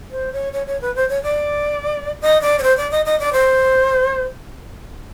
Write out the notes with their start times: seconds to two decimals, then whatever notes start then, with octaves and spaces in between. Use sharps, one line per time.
0.11 C5
0.32 C#5
0.53 C#5
0.67 C#5
0.81 B4
0.95 C5
1.09 C#5
1.23 D5
2.22 D#5
2.42 D5
2.59 C#5
2.63 C5
2.77 D5
2.91 D#5
3.05 D#5
3.20 D5
3.33 C5